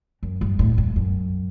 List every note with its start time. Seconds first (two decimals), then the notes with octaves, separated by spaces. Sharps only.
0.23 F#2
0.41 G2
0.59 A2
0.78 G2
0.96 F#2